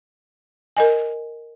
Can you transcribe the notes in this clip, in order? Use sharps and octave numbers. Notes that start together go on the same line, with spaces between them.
A#4 D#5 G#5